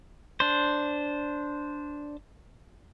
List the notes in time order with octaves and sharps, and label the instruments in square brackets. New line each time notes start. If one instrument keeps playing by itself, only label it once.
[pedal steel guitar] D4 C5